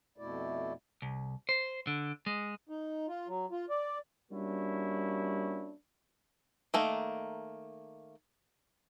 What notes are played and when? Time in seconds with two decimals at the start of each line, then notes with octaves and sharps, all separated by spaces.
0.18 F2 B2 A3 E4 D5
1.02 C2
1.49 C5
1.87 D3
2.26 G#3
2.69 D#4
3.08 F4
3.28 F#3
3.51 F4
3.69 D5
4.32 G3 A#3 C#4 D4 E4 F#4
6.74 D#3 A3 A#3